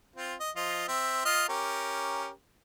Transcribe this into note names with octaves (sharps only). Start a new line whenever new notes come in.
C4 F4
D#5
F3 F4 D#5
C4 E5
F4 D#5 F6
C#4 G4 A#4